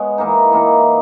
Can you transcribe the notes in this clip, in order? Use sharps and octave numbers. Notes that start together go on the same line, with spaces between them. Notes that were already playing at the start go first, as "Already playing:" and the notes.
Already playing: G#3 B3 C#5
E3 A#3 D#4
E3 A#3 D#4